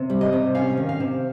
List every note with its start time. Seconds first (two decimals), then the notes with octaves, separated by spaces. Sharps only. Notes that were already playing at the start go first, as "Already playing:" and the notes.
Already playing: C3
0.10 G3
0.21 D#5
0.33 C3
0.55 C#4 F5
0.77 D#3
0.89 F5
1.00 C3